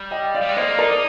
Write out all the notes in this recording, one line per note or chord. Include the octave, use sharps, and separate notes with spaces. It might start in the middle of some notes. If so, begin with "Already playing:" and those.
Already playing: G3
D#5 G5
D5 F5
G3
G#3
A#3 C5 D#5
D#4 A#4 D5